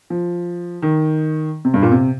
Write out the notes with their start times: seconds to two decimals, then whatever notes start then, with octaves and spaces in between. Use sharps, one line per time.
0.10 F3
0.82 D#3
1.65 C3
1.74 G2
1.82 A#2
1.92 C3